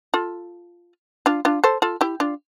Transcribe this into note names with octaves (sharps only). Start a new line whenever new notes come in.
F4 A4
D4 F4
D4 F4
A4 C5
F4 A4
E4 G4
D4 F4